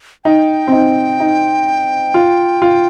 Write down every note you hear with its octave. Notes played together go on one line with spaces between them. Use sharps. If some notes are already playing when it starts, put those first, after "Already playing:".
D#4 G5
C4
D#4
D#4
F4
F4